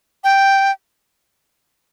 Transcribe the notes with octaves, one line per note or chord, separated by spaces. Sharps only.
G5